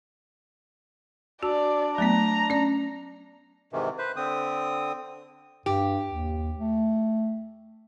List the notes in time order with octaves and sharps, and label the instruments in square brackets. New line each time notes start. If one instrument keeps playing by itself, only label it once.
[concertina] D4 [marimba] F#4 [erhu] D5
[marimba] F#3 A3 B3 [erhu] A#5
[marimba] C#4 D5
[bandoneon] G#2 C3 D#3 E3
B4 C5
D3 C4 D#6
[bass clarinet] G2 [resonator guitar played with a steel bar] G4
[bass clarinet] D#2
A3